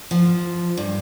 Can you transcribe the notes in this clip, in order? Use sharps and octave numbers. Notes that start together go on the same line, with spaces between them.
F3
G2